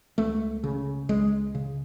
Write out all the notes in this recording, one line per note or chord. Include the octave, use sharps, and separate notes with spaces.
C#2 A3
C#3
C#2 G#3
C#3